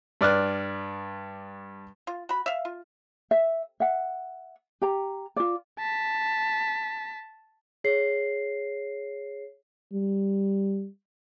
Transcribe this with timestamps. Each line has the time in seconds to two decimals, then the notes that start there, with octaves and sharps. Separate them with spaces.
0.21 G2 D5 F6 F#6
2.07 F4
2.29 F#4 B5
2.46 E5 F5
2.65 F4
3.31 E5
3.80 E5 F#5
4.82 G4 A#5
5.36 F4 D5
5.79 A5 B6
7.84 G#4 C#5 C7
9.93 G3